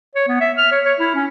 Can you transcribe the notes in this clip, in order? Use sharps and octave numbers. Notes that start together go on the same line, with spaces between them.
C#5
B3
E5
F6
C#5
C#5
E4
C#4